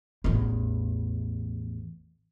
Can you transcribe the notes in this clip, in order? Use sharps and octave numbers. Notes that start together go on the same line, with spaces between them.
A1 E2